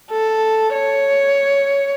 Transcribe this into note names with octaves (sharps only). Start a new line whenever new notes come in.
A4
C#5